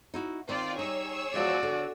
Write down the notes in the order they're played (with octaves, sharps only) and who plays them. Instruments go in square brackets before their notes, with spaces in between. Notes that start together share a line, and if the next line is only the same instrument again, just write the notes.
[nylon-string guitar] D#4 E4 F#4
[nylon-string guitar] D#3 C4 [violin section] F4 D5
[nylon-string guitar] G3 D#4 [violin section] G#4 C#5 E6
[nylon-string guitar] E2 F3 G#3 [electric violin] F#4 D5
[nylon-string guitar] D3